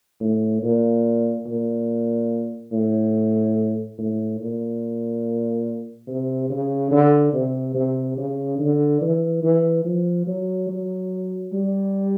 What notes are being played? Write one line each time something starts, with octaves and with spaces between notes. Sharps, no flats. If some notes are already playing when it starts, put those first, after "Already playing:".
A2
A#2
A#2
A2
A2
A#2
C3
C#3
D3
C3
C3
C#3
D3
E3
E3
F3
F#3
F#3
G3